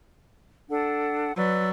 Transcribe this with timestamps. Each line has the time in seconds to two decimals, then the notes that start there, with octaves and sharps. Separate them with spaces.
0.69 D4 A4 F#5
1.36 F#3 B4 D5 E6